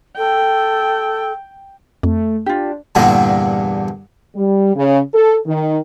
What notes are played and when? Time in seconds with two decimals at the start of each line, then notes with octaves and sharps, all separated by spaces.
0.17 A4 G5
2.03 F2 A3
2.46 D4 F4 G4
2.95 E2 G2 A#2 D3 G3
4.35 G3
4.76 C#3
5.14 A4
5.46 D#3